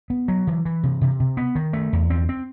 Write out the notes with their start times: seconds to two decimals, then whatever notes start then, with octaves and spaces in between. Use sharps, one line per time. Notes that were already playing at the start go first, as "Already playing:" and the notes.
0.10 B3
0.28 F#3
0.47 E3
0.65 E3
0.83 C3
1.01 C3
1.20 C3
1.37 B3
1.55 D#3
1.73 A3
1.93 E2
2.10 C4
2.29 C4